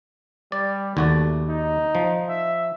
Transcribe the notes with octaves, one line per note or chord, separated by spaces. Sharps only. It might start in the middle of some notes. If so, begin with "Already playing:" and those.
G3 D5
D#2 A3 F#4 D5
D#4
F3
E5